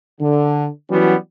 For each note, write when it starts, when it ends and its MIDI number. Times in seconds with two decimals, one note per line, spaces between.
0.21 0.66 50
0.90 1.14 52
0.90 1.14 54
0.90 1.14 55
0.90 1.14 59
0.90 1.14 61
0.90 1.14 66